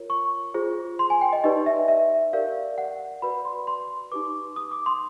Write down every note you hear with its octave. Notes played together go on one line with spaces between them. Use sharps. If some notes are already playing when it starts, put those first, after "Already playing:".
Already playing: F4 A#4 C#5
C#6
F4 G#4 C5
C6
G#5
G5
D#5
D#4 G4 B4 D5 D#5
E5
E5
G4 A#4 D5 F5
F#5
F#4 B4 D5 B5
C6
C6
D#4 G4 B4 D6
D#6
D6
C6